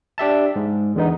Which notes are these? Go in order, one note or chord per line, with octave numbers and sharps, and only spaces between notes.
D4 G4 E5 A5
G#2
E2 D3 B3 D#4